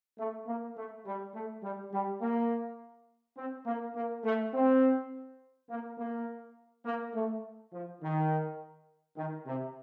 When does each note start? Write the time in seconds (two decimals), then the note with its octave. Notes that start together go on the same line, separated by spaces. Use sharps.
0.18 A3
0.47 A#3
0.77 A3
1.06 G3
1.34 A3
1.63 G3
1.92 G3
2.22 A#3
3.37 C4
3.66 A#3
3.96 A#3
4.24 A3
4.54 C4
5.70 A#3
5.98 A#3
6.85 A#3
7.14 A3
7.73 F3
8.02 D#3
9.17 D#3
9.46 C3